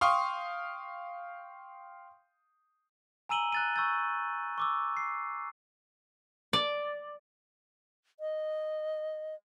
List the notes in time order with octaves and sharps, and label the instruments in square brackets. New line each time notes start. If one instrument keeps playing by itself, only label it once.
[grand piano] F5 G5 C6 C#6 D#6
[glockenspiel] G#5 A#5 E6 D#7 F#7 G7
F#6 A6 D#7
C#6 E6 G6 A6
C#6 D6 E6
C7
[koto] D5
[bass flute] D#5